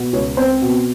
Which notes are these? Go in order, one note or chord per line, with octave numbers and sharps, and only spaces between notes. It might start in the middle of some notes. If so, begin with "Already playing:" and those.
Already playing: B2
C#2 C#5
C4 C5
B2